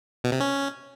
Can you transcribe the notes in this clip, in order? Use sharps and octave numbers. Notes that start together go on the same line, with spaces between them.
B2
C3
C#4